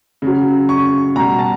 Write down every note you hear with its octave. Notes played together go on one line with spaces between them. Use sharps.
C#3 F#3
C#6
B2 G3 A#5
A5